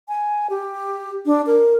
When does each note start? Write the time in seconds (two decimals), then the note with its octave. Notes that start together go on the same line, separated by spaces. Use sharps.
0.08 G#5
0.50 G4
1.26 D4
1.47 A#4